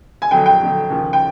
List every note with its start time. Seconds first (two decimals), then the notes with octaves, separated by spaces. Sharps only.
0.22 G#5
0.31 F2 D3 F#3 G5
0.46 G5
0.61 F2 D3 F#3
0.90 D#2 C#3 F3
1.13 G5